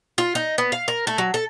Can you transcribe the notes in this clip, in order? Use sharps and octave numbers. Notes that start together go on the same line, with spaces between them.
F4
D#4
B3
F5
A#4
A3
F#3
A4